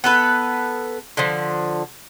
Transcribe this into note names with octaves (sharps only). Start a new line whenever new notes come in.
B3 A4 B4
D3 F3